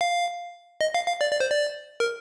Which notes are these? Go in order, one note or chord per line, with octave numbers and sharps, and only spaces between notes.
F5
D#5
F5
F5
D5
D5
C5
D5
A#4